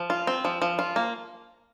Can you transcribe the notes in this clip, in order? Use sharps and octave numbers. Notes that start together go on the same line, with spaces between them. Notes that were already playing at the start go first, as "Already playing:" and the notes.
Already playing: F3
F4
C4
F3
F3
F4
A#3